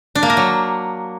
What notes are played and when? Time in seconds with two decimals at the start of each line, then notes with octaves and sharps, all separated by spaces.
0.15 D4
0.23 A#3
0.30 A#4
0.37 F#3